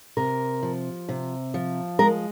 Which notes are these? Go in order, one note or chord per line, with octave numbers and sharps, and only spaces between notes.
C3 A#4
F3
C3
F3
G#3 A#4